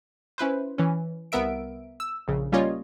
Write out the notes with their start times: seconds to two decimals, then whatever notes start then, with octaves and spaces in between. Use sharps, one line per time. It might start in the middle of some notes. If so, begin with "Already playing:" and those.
0.38 C#4 E4 B4 C5
0.78 E3 C#4
1.32 C2 B3 A#4 E5 D7
2.00 E6
2.28 A#1 C#3
2.52 G3 A#3 C#4 F4 C#5 D#5